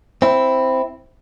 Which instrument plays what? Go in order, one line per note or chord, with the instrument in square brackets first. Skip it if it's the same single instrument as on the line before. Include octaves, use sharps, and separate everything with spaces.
[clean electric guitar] C4 E4